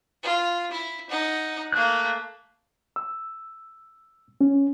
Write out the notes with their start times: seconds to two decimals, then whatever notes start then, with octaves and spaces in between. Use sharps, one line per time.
0.23 F4
0.71 E4
1.10 D#4 F#5
1.72 A3 A#3 F#6
2.96 E6
4.41 C#4